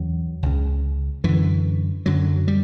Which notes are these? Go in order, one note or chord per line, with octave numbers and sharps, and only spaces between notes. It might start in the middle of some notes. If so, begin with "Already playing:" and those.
Already playing: E2 C#3 F#3
C#2 C#3
F#2 D3 E3
F#2 D3 F#3
G3